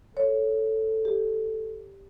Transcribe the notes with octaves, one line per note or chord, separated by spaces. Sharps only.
A4 C#5
G4